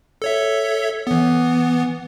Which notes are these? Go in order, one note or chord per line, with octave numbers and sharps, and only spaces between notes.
A4 C#5 E5
E3 B3